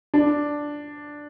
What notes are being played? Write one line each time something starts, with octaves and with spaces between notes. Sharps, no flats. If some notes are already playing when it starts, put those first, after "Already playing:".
D4